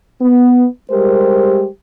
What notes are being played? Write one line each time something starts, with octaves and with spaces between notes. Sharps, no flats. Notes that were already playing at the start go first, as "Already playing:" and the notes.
B3
G3 G#3 G4 A#4 C5